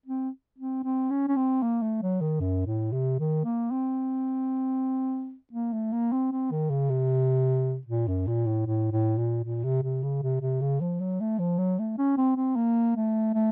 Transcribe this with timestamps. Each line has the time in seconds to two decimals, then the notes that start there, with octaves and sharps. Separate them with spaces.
0.06 C4
0.58 C4
0.84 C4
1.10 C#4
1.28 C#4
1.36 C4
1.63 A#3
1.83 A3
2.02 F#3
2.21 D#3
2.40 F#2
2.66 A2
2.92 C3
3.19 D#3
3.45 A#3
3.71 C4
5.53 A#3
5.73 A3
5.93 A#3
6.12 C4
6.32 C4
6.51 D#3
6.70 C#3
6.90 C3
7.87 A#2
8.08 F#2
8.27 A#2
8.47 A2
8.66 A2
8.92 A2
9.18 A#2
9.44 A#2
9.64 C3
9.83 C3
10.03 C#3
10.23 C3
10.41 C3
10.61 C#3
10.81 F3
11.00 F#3
11.21 A3
11.39 F3
11.59 F#3
11.79 A3
11.98 C#4
12.18 C4
12.37 C4
12.56 A#3
12.96 A3
13.34 A3